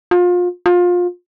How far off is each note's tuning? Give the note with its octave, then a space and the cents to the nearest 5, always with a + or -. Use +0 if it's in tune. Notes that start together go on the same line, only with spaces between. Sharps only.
F4 +30
F4 +25